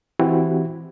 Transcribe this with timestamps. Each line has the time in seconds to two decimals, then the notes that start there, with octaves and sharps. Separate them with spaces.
0.19 E3 C4 E4 F#4 G4